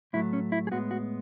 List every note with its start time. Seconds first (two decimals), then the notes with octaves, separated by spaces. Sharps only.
0.13 A2 F#3 A3 E4
0.33 C#4
0.52 E4
0.67 G#4
0.71 A2 G#3 B3 F#4
0.91 F#4